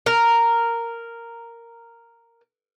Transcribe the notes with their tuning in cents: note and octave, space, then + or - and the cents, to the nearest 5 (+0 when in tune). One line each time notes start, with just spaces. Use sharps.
A#4 -5